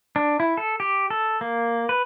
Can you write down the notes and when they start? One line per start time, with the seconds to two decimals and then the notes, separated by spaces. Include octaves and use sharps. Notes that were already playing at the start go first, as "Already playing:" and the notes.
0.16 D4
0.40 E4
0.57 A4
0.80 G4
1.10 A4
1.41 A#3
1.89 B4